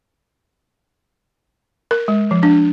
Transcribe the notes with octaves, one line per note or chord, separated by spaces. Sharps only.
A#4
G#3
F3
D4